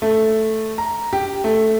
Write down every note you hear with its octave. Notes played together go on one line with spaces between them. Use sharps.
A3
A#5
G4
A3